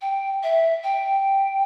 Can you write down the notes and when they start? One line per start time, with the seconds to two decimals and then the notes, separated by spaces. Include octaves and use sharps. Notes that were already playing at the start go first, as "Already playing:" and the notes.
0.01 G5
0.43 E5
0.83 G5